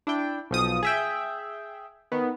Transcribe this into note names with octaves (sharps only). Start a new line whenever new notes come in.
D4 E4 G5
B1 F3 D#6
G#4 E5 G5
D#3 B3